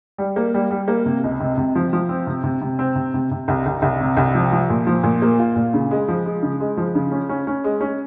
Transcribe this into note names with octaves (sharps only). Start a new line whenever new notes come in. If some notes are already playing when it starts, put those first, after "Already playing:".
G3
A#3
G3
G3
A#3
C3
C#2
C3
C3
F3
F3
C4
C3
C3
C3
C4
C3
C3
C3
C2
C2
C2
C3
C2
F3
F3
A#2
F3
A#2
A#3
F4
A#2
C#3
G#3
F3
G#3
C#3
G#3
F3
C#3
C#4
C#4
C#4
G#3
C#4